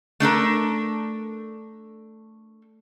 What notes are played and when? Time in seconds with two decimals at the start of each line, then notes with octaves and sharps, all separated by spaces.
0.20 A3 D4 A4 A#4